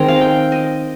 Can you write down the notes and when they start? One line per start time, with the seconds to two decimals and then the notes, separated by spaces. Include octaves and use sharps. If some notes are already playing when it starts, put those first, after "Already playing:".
Already playing: D#3 G#3 C4 A#5
0.08 F5
0.21 G5
0.52 D#5